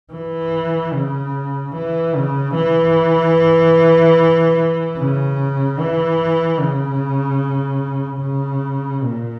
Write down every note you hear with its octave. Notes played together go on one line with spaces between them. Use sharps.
E3
C#3
E3
C#3
E3
C#3
E3
C#3
C#3
A#2